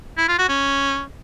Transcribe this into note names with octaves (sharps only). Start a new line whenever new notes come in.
E4
F4
F#4
C#4